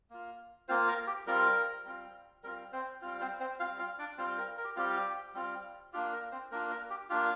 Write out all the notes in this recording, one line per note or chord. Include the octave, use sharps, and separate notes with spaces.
A#3 F4
A#3 C4 F4 C5
A#4
G4
G3 C4 F4 A#4
G3 C4 F4
G3 C4 F4 A#4
C4 C5
G3 C4 F4
C4 C5
C4 C5
G3 C4 F4 F5
F4 F5
D4 D5
G3 C4 F4 C5
A#4
A#4
G4
G3 C4 F4 G4
G3 C4 F4
A#3 D4 F4 G4
A#4
C4 C5
A#3 D4 F4 A#4
A#4
G4
A#3 D4 F4 G4